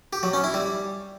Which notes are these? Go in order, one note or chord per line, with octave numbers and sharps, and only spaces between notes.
G4
F#3
C#4
E4
G3